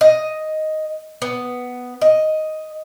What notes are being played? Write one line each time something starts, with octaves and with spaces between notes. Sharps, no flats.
D#5
B3
D#5